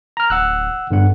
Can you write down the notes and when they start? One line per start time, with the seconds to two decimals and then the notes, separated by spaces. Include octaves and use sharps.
0.17 A#5 F6
0.30 D1 F#5 E6 F#6
0.91 G1 G2 D3 F#5